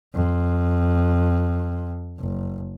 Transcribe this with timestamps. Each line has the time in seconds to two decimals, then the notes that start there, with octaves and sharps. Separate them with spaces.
0.14 F2
2.19 F#1